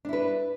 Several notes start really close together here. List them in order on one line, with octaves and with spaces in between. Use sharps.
D4 E4 B4